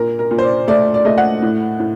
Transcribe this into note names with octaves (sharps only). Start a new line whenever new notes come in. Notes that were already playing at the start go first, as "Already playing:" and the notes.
Already playing: A#2 A#4
A#4
A#2
C5
D5
A3 D5
D5
A3 D#5
F#5
A2
A2